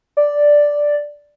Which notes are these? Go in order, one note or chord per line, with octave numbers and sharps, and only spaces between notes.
D5